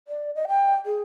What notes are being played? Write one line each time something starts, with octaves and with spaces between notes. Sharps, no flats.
D5
D#5
G5
G#4